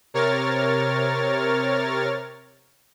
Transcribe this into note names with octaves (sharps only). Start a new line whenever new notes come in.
C3 A#4 C#5 F6 A6